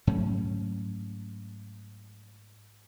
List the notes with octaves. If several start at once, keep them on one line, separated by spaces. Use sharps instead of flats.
G#2 F#3 A3 C#4